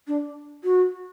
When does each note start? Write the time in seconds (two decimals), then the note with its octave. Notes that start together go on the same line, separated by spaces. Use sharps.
0.08 D4
0.64 F#4